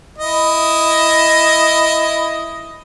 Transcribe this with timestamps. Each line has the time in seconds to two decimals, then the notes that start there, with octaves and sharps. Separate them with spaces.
0.18 E4 D#5